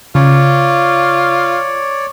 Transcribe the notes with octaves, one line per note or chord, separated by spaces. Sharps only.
C#3 F4 C#5 D5